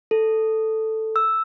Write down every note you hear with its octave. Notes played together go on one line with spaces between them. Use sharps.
A4
E6